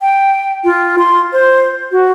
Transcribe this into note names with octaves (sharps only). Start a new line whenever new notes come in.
G5
F4
C6
C5
F#4